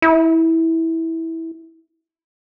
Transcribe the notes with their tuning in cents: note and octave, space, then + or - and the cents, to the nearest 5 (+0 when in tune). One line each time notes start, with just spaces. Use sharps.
E4 -15